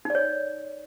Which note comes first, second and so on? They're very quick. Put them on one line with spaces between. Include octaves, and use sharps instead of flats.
D#4 D5 C#5